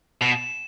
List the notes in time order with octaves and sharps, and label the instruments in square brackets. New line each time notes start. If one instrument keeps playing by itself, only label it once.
[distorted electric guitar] B2 [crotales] E7